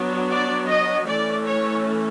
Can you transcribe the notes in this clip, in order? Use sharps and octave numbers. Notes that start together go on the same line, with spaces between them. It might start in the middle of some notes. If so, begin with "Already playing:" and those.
Already playing: F#3 B3 D4
D5
D#5
E3 A3 C#4 D5
C#5